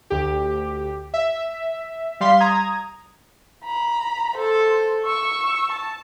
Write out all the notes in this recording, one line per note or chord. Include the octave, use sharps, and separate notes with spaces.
D2 G4
E5
G3 F5 C6 B6
A#5 D#6 G#6
A#5 B5
A4 C5
C#6 E6
A5